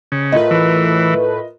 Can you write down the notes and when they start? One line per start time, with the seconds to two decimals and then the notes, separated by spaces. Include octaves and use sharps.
0.12 C#3
0.32 A2 A3 F4 A#4 B4 D#5
0.51 E3